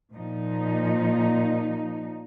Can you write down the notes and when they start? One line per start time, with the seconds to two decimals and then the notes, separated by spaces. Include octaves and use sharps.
0.14 A#2 F3 D#4